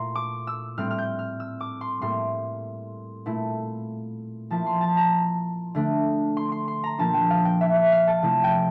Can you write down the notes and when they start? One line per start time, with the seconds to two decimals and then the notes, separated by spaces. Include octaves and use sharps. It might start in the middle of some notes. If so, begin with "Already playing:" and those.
Already playing: A#2 A3 E4 A#5 C6
0.15 D6
0.47 E6
0.78 A2 G3 C4 F6
0.91 F6
0.98 G6
1.19 F6
1.40 E6
1.61 D6
1.81 C6
2.02 A2 G3 A#3 C6
3.26 A#2 A3 E4
4.50 F3 A#3 E4 A5
4.66 C6
4.81 A5
4.97 A#5
5.75 D3 A3 D4
6.37 C6
6.52 C6
6.68 C6
6.84 A#5
6.98 A#2 F3 A#3 D4 A5
7.14 G5
7.30 F5
7.45 G5
7.61 E5
7.76 E5
7.92 F5
8.07 A5
8.22 C3 F3 A3 E4
8.44 G5